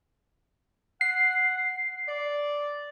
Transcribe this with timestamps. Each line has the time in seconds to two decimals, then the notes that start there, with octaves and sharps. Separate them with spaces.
1.01 F#5 C7
2.08 D5